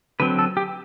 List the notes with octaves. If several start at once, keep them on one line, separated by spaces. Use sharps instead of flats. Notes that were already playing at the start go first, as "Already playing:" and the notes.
D3 F#3 C4 B4
A4
G4